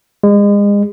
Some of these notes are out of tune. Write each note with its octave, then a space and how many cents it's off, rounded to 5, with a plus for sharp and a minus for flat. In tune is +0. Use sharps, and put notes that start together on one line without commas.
G#3 -35